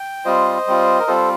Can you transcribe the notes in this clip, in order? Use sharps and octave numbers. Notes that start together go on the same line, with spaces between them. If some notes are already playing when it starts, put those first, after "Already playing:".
Already playing: G5
G3 C4 F4 C5 D#5
G3 C4 F4
A#4
G3 C4 F4 A4 C5